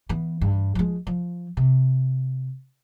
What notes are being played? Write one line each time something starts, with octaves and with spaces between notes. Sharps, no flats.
E3 B3
G2
F3 G#3
F3
C3